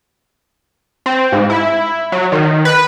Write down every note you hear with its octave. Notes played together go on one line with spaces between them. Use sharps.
C4
G#2
E4
F#3
D#3
B4